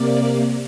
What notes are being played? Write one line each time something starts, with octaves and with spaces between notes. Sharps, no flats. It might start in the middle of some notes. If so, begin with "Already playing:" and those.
Already playing: C3 A#3 D5